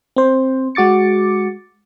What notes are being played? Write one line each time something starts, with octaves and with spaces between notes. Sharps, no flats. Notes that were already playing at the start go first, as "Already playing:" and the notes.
C4 C5
G#3 F#4 D6 A6 C#7